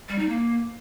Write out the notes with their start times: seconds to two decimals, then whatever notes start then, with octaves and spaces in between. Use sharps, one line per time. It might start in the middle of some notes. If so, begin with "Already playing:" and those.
0.09 G3
0.18 D#4
0.28 A#3